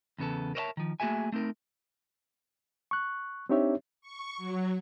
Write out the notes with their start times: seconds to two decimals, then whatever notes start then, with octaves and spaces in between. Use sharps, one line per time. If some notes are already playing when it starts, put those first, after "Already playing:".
0.18 E2 C#3 B3 A4
0.55 A#4 C5 C#5 D#5 E5 A5
0.77 D#3 F3
1.00 A3 A#3 F#4 G#4 E5 G#5
1.32 A3 C4 D#4 A#4
2.91 C#6 F#6
3.49 C4 D4 D#4 G4 C#5 E5
4.02 C#6
4.38 F#3